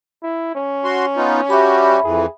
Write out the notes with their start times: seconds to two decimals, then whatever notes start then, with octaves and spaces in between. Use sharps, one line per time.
0.23 E4
0.55 C#4
0.85 F#4 C6
1.17 B3 D#4 F4
1.50 G3 F#4 G4 E5 B5
2.04 F2 E3 G#4